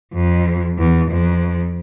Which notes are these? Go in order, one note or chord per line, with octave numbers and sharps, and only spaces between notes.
F2
E2
F2